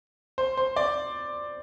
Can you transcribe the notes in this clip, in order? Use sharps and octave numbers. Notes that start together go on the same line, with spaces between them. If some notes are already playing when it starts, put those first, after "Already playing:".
C5
C5
D5